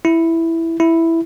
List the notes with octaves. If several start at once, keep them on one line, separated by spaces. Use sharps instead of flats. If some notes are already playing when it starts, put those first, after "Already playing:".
E4
E4